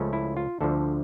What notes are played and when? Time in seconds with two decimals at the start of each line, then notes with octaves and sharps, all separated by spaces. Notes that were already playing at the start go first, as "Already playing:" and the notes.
Already playing: C#2 C#3 F3 A3 C#4
0.13 E4
0.37 F4
0.61 D2 D3 F3 A4